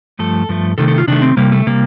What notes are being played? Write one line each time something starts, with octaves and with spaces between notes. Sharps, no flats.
G2 F3 A3 A4
G2 F3 A3
C3 D#3 A3 A4
A4
F4
C3 D#3 A3 D4
C4
C3 G3 A#3
A3
C3 G3 A#3